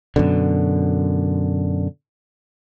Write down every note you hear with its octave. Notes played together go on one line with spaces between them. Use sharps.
F#2 B2 D3